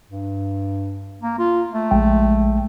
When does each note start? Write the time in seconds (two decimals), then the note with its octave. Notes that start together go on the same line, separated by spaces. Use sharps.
0.10 G2
1.22 A#3
1.39 F4
1.73 A3
1.91 A#1 G#3 G5